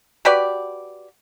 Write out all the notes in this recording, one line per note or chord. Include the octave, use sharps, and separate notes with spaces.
F#4 G4 B4 D5